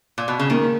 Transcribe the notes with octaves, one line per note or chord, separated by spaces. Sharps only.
A#2
B2
C#3
D#3 A#3